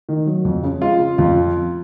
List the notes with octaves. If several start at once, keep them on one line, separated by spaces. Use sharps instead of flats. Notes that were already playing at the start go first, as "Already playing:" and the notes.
D#3
F#3
F2
C#3
G#3 F4
C#3
F2 F4